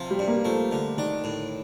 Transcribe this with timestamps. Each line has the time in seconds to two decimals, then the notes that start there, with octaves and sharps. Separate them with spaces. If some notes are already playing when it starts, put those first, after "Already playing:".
Already playing: C3 F3
0.11 G3
0.19 G2
0.28 A#3
0.45 F3 A3
0.71 D3
0.97 D#3 D4
1.24 A2